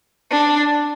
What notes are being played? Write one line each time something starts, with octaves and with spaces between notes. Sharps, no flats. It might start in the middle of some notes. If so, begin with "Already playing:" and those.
D4